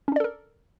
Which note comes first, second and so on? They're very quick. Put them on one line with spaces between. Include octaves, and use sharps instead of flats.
C#4 D4 D5 A4 A#4